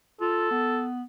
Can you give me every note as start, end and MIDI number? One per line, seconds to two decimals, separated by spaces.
0.21 0.50 65
0.21 0.86 69
0.51 1.03 59